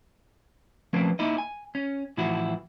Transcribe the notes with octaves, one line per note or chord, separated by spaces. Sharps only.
F3 A3 A#3 C4 C#4 B4
A#3 D#4 E4 D#5
G#5
C#4
A2 E3 F3 E4 F#4